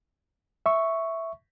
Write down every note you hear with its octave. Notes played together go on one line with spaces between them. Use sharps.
E5 C#6